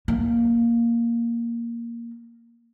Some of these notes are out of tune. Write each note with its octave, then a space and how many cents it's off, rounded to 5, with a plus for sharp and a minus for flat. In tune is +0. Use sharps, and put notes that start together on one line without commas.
A#3 +0